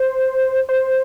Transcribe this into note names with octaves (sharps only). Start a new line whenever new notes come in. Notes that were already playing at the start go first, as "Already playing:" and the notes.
Already playing: C5
C5